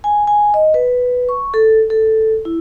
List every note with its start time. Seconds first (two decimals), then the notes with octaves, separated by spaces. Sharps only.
0.04 G#5
0.27 G#5
0.54 D#5
0.74 B4
1.29 C#6
1.54 A4
1.90 A4
2.45 E4